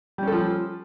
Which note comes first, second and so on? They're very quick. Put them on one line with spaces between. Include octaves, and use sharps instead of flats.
G3 C#4 A4 F3